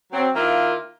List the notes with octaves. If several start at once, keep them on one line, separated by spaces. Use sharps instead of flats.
F#3 C4
D#3 A#3 E4 F4